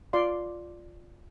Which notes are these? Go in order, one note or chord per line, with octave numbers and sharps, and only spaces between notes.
F4 D5 F5 C6